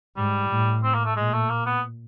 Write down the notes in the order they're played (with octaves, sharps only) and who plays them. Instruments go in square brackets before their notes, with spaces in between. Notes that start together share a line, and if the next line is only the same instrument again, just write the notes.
[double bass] G#2 [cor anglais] G3
[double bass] A2
[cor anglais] C4
A#3
A3
[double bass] A#2 [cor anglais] G#3
[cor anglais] A3
A#3
B3